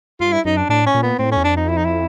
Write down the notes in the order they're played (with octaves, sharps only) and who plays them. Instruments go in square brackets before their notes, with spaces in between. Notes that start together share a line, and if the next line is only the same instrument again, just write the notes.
[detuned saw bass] G2 [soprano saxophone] F4
[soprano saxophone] E4
[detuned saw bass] F#2 [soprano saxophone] D#4
[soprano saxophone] D4
[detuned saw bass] A2 [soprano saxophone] D4
[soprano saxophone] C#4
[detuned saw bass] A#2
[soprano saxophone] B3
[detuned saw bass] A2 [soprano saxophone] C4
[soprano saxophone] C#4
[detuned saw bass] E2
[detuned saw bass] F2 [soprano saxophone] D4
[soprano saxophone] D#4
E4
D#4
E4